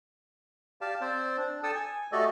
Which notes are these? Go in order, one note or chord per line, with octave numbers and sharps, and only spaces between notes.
G4 D5 F5 A5
C4 C5 D5
D4
A4 D5 G5 A5 D#6 E6
G#5
A3 F#4 G4 A4 D5 D#5